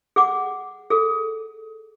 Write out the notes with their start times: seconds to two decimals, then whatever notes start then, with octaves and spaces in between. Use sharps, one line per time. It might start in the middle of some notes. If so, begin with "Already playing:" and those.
0.16 G#4 F#5 D6
0.90 G#4 A4